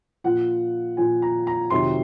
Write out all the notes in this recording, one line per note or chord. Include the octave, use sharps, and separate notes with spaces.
A#2 F3 F#5
A#2 F3 G#5
A#5
A#5
F2 C3 D#3 F#3 C6